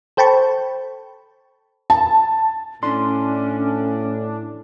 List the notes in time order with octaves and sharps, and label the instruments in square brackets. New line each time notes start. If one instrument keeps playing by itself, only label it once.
[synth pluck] A4 C5 G5 A5 B5 C#6
[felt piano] A5
[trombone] A2 [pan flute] C#4 [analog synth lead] D4 [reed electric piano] C6